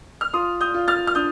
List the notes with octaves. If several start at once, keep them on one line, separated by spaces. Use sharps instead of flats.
F6
F4 C6 D#6
D#6 G6
F4
F6 A6
F6
D4 D#6 G6